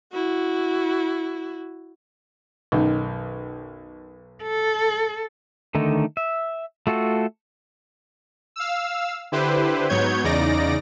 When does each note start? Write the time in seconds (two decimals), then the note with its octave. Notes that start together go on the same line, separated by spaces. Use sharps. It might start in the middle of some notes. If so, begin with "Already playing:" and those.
0.13 E4 F#4
2.72 B1 F#2 D#3
4.43 A4
5.75 D3 D#3 A3 D#4
6.17 E5
6.87 A3 F4 F#4 A4
8.56 F5 E6
9.32 D3 E4 G4 B4 C5
9.89 G#2 F#3 B3 C#5 G6 G#6
10.24 E2 C#3 D#4 D5 A#6 D7